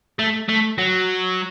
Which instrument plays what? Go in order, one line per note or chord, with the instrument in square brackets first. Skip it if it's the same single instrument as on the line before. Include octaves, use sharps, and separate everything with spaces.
[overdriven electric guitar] A3
A3
F#3